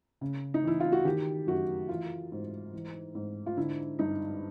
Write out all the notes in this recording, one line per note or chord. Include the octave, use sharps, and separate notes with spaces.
C#3
D#4
E3 E4
F4
F#4
D#3 G4
F#2 F#4
E3 F4
G#2
E3
G#2
F4
D3 E4
G2 D#4